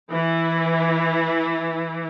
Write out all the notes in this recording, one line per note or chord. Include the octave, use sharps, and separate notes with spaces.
E3 E4